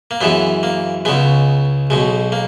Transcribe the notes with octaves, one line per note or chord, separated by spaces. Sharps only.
A#3
F#2 E3 G#3 B3
A#3
C#2 C#3 G#3 B3
B1 B2 G#3
A#3